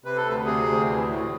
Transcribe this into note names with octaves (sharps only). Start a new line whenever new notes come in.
C3 B4
A4
D2 B4
C3 G#4
D2
E3
A2